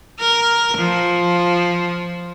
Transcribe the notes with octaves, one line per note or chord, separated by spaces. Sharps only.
A#4
F3